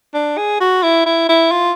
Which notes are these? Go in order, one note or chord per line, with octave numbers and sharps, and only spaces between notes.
D4
G#4
F#4
E4
E4
E4
F4